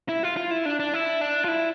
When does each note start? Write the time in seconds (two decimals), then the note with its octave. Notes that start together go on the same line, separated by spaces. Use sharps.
0.09 E4
0.23 F4
0.37 F4
0.51 E4
0.65 D4
0.80 D4
0.94 E4
1.21 D4
1.45 F4
1.48 E4